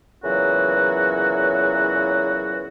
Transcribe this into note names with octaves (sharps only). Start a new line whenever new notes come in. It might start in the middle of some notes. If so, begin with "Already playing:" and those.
E2 A#2 C#3 E3 F#3 F#4